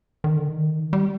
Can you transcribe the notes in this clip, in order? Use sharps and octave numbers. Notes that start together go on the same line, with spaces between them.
D#3
D3
D#3
G3